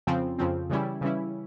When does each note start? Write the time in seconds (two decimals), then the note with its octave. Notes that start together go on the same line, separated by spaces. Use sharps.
0.07 F2 C#3 F3 C4
0.38 F2 C#3 F3 C4
0.70 C#3 E3 G3 C#4 E4
1.01 C#3 E3 G3 C#4 E4